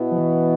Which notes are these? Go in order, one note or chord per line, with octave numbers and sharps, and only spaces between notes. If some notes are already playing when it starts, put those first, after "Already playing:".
Already playing: B2 B3 E4
F3
E3